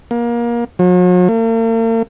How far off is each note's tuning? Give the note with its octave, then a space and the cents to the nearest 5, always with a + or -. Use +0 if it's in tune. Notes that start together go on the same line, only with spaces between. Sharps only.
A#3 +25
F#3 -45
A#3 -45